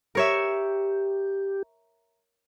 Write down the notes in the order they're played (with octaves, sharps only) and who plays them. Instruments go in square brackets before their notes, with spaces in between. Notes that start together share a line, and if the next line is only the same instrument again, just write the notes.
[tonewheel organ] G4 [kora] A#4 C#5 E5